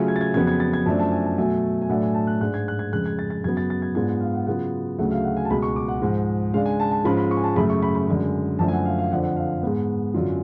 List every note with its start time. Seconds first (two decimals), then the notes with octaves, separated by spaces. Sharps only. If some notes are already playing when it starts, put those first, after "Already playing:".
Already playing: C#3 F#3 A3 C#4 F4
0.08 G#6
0.16 A6
0.21 G#6
0.34 F2 C#3 F#3 B3 G#6
0.47 G#6
0.60 A6
0.74 G#6
0.86 F#2 F3 A3 D4 A5
1.00 A5
1.12 G#5
1.25 A5
1.38 B2 F#3 A3 G#5
1.82 G#5
1.89 A2 F#3 A3 D4 F#5
2.03 G#5
2.14 A5
2.27 F#6
2.41 G#2 G#3 D4 F#6
2.54 G#6
2.68 F#6
2.79 G#6
2.92 F2 C#3 G#3 F#6
3.06 G#6
3.19 A6
3.30 A6
3.44 F#2 C#3 F#3 B3 G#6
3.57 A6
3.70 A6
3.82 G#6
3.95 G#2 G#3 B3 D4 F4 G#6
4.21 F5
4.35 F#5
4.47 C#3 F#3 B3 F4 F#5
4.98 D2 C#3 F#3 A3 F#5
5.11 F5
5.24 F#5
5.37 G#5
5.45 A5
5.50 C#2 B2 G#3 B5
5.63 C#6
5.76 D6
5.88 F#5
6.02 G#2 F3 G#3
6.53 C#3 G#3 D4 F5
6.66 G#5
6.80 A5
6.91 A5
7.04 G#2 F3 G#3 C#4 F4 B5
7.17 B5
7.31 C#6
7.37 G#5
7.44 A5
7.56 F#2 C#3 F#3 A3 B5
7.70 C#6
7.82 B5
7.95 B5
8.08 F#2 D3 G#3
8.59 F#2 D3 F3 A3 A5
8.68 G#5
8.73 F#5
8.85 F5
8.99 F5
9.12 F2 D3 F3 F#5
9.23 F#5
9.37 F5
9.63 G#2 G#3 B3
10.14 F#2 D3 F#3 C#4 F4